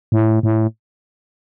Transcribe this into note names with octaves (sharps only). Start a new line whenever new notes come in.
A2
A2